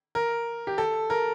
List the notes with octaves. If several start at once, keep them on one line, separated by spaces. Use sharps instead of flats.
A#4
G4
A4
A#4